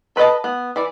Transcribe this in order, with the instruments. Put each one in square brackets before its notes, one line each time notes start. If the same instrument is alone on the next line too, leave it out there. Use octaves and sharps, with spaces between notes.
[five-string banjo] A4 B4 C5 D#5 A5
B3
E3 D5